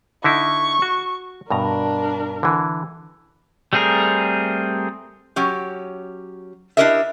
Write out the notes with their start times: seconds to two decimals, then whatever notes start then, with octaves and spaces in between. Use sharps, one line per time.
0.24 D3 D#4 E4 C#6
0.82 F#4
1.50 G2 B2 D4 A#4 A#5
2.43 D3 E3
3.73 G3 A3 C4 G#4 A#4
5.36 F#3 C#4 G4
6.77 D4 E4 G4 A#4 D#5 E5